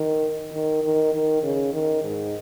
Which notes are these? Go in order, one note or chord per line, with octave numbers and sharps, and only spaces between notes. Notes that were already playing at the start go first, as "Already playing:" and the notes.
Already playing: D#3
D#3
D#3
D#3
C#3
D#3
G#2